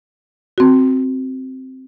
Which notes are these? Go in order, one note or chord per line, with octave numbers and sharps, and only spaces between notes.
C4 F#4